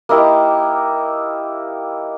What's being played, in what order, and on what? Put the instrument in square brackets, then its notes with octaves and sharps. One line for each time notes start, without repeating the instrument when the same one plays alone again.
[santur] A#3 D#4 E4 G4